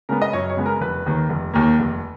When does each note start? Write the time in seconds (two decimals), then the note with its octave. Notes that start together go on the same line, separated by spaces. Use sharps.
0.09 C#3 G#3 B3 A#4
0.22 D#5
0.33 F#2 C#5
0.50 C#5
0.57 C#3 G#3 B3
0.66 A#4
0.81 F1 B4
1.06 D#2 D#3 A#3
1.29 F1
1.54 D#2 D#3 A#3
1.79 F1